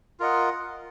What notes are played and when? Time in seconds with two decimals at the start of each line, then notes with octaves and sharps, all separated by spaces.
0.20 F4 A#4 D#5 F#5